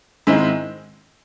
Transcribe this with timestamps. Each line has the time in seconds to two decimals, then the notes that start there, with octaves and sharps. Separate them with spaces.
0.27 G#2 D#3 G#3 C4 E4